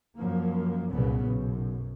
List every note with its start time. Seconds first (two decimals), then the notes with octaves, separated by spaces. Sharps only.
0.17 F#2 F3 A#3
0.91 C2 F#2 A#2 C#3 B3
1.26 B1 F#2